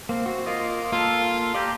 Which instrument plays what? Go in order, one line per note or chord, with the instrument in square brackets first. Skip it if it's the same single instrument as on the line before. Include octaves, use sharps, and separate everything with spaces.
[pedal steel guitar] A#3 [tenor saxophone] C4
[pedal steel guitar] F#4
[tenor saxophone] A#3 [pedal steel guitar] F4 D#5
[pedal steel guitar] A#3 A4 [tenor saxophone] F4
[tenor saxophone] G4 [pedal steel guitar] D5 G5 A#5